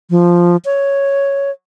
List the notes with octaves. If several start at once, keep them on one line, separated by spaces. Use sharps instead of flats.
F3
C#5